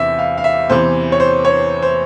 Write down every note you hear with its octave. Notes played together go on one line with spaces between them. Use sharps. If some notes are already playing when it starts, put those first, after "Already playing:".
Already playing: E2 C3 E3 E5
F5
F5
E5
E2 C3 E3 C5
C#5
C5
C#5
C5